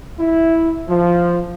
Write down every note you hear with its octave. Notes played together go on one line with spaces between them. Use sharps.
E4
F3